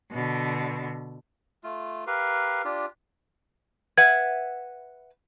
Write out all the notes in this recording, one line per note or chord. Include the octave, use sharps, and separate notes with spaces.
B2 D3
A3 F4
G4 A#4 B4 F5
D4 F4 G4
B4 E5 F#5 G#6